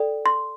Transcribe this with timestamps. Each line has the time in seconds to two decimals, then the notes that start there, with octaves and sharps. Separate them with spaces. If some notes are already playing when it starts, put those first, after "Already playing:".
Already playing: A4 D5 G5
0.26 C6